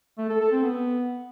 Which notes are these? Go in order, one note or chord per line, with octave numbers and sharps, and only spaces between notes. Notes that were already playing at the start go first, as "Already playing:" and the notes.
A3
A4
A4
C4
B3